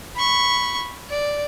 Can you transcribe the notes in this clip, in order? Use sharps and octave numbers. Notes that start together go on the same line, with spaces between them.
B5 C#6
D5